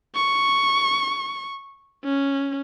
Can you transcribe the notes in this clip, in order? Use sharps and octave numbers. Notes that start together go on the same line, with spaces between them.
C#6
C#4